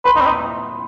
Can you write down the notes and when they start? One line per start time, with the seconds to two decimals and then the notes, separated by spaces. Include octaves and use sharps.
0.05 B4 C6
0.16 D#4 B5
0.21 C4
0.26 D#4 B5